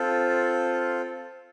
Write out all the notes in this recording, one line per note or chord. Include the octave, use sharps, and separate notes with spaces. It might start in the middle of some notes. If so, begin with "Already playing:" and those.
Already playing: C4 F4 A4